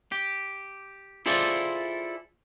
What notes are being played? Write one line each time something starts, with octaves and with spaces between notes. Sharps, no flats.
G4
E4 F4 G#4 A4 C5 D5